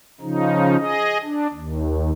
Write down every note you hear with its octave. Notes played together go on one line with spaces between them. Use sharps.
C#3 F3 D#4
G#4 D#5
D4
D#2